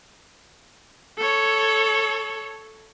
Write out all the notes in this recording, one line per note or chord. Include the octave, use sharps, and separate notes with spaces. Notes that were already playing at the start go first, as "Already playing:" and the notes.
A4 C#5